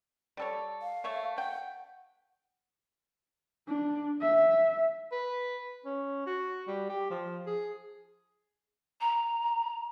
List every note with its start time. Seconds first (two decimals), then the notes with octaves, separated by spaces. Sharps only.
0.37 G3 A4 C#5
0.82 F5
1.04 A3 C#5 E5
1.38 F#5 G5
3.68 D4
4.21 E5
5.12 B4
5.85 C#4
6.27 F#4
6.67 G3
6.89 G4
7.10 F3
7.47 G#4
9.01 A#5